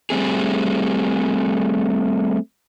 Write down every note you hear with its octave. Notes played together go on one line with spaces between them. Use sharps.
G3 A3 C4 G#4